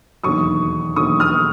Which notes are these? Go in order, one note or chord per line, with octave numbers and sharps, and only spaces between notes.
E1 D#2 D3 F#3 C#6 D#6
E1 D#2 D3 F#3 C#6 D#6
D#6 F6